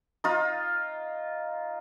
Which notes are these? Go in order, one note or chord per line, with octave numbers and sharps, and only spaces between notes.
D#4 F4